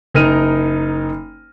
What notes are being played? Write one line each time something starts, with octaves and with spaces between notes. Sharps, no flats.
F#1 D#4 A#4 F6 D#7